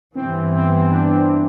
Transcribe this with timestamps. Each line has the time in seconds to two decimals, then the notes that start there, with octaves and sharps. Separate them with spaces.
0.15 G2 E3 B3 C4
0.56 C4
0.75 C4
0.91 D4
1.06 C4